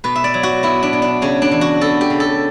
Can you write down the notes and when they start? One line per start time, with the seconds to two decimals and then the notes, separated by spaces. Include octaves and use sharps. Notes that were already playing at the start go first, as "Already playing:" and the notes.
0.04 B2 B4
0.15 E5
0.24 D5
0.34 F#3
0.43 F#4
0.63 B3 E4
0.83 D4
0.93 B2
1.02 D4
1.22 C#3 C#4
1.42 D4
1.51 E3
1.61 F#4
1.81 B3 A4
2.01 G4
2.10 C#3
2.20 A4